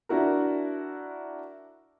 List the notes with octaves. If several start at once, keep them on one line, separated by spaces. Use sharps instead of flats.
D4 E4 F#4 A#4